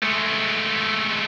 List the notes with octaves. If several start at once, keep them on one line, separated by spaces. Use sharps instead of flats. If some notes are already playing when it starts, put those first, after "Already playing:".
G#3 A3